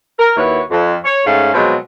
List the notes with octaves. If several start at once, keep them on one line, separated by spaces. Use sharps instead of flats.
A#4
D#2 E4 F#4 B4 C#5
F2
C#5
G#2 A3 C#4 F5
B2 F3 F#3 G#3 C4